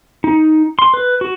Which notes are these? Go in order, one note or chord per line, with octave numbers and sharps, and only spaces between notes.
D#4
C6
B4
F#4